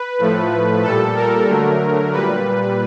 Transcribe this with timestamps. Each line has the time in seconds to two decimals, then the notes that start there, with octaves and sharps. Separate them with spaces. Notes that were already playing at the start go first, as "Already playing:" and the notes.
Already playing: B4
0.18 A2 F3 A3
0.82 A#2 G3 A4
1.16 A#4
1.47 D3 F#3 A3
2.12 A#2 G3 B4